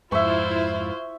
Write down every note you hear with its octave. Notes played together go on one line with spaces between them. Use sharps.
F2 G#2 E4 F4 C5 E5 C#6